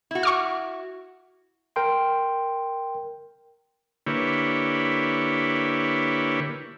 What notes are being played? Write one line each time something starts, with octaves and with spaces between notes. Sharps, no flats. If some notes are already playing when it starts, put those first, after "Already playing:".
E4 F#4
C#6 D6 F6
A#4 G5 C6
D3 A#3 E4 G4 B4 C#5